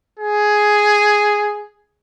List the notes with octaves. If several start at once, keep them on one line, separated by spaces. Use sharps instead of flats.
G#4